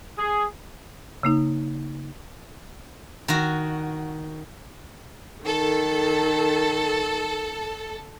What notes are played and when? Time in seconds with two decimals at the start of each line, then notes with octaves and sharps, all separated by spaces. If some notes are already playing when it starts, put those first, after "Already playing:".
0.19 G#4
1.23 C#3 A#3 D#4
3.28 D#3 F#4
5.45 D#3 A4